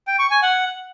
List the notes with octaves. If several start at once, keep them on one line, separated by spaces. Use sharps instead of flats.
G5
C#6
G#5
F#5